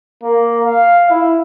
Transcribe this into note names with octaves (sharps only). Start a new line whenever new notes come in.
A#3
F5
E4